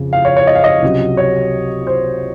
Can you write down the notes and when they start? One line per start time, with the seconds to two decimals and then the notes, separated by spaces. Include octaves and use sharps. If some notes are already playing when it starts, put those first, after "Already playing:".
Already playing: F2 C#3 F3
0.13 F5
0.25 C#5
0.37 C#5
0.47 D#5
0.55 F5
0.64 D#5
0.82 C#2 C3 F#3
1.17 C#5
1.87 C5